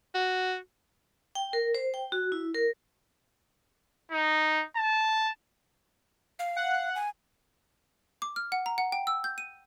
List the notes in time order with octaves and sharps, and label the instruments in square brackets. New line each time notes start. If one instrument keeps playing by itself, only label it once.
[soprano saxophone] F#4
[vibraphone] G5
A#4
C5
G5
F#4
E4
A#4
[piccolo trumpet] D#4
A5
[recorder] F5
[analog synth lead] F#5
[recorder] G#5
[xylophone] D6
F6
F#5
A#5
F#5
G5
E6
G6
D#7